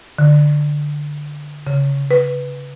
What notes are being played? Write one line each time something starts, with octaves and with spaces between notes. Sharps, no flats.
D3
C#3
B4